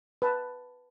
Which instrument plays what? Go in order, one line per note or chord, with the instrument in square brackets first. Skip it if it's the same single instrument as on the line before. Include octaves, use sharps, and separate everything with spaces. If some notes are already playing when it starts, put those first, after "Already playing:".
[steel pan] B4 A5